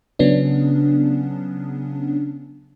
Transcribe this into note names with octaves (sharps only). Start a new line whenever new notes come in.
C#3 F#3 B3 C#4 D4